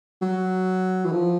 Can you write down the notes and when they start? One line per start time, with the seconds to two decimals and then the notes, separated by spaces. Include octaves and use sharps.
0.22 F#3
1.05 E3
1.12 F3